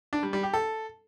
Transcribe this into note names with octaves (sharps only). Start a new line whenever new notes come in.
D4
G3
G3
G4
A4